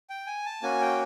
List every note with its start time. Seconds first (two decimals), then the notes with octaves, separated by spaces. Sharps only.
0.10 G5
0.27 G#5
0.46 A5
0.63 A#3 C#4 F#4 G#5
0.81 G5